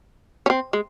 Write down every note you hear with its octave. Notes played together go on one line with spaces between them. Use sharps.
C#4
C4
G#3